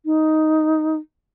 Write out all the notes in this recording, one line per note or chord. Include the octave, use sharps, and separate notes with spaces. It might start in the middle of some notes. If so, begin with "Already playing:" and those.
D#4